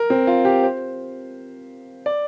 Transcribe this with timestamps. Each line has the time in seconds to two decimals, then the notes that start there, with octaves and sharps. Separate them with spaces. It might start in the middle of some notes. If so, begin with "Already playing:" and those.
Already playing: A#4
0.10 C4
0.27 F4
0.45 G4
0.63 C5
2.06 D5